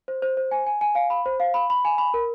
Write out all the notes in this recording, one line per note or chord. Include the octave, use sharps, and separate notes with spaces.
C5
C5
C5
G#5
G#5
G#5
F5
B5
C5
F5
B5
B5
G#5
B5
A#4